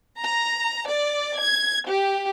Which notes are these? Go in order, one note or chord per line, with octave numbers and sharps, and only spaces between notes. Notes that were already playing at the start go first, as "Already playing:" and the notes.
A#5
D5
G#6
G4